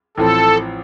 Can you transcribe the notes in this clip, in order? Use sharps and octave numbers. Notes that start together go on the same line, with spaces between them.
A1 A2 F3 C4 A4